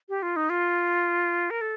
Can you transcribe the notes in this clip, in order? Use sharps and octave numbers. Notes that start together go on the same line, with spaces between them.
G4
F4
D#4
F4
A#4
A4